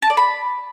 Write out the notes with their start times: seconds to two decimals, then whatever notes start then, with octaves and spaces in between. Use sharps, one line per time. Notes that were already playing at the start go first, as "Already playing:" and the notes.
0.02 A5
0.10 D5
0.17 B5